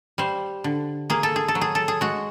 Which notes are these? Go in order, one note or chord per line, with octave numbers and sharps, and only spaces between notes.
G3 C5
D3
A#3 G#4
A4
G#4
A4
F#3
G#4
A4
G#4
G#3 F#4